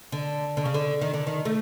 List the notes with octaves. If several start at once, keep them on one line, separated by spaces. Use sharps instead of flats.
D3
D3
C#3
D3
D#3
D3
D#3
A3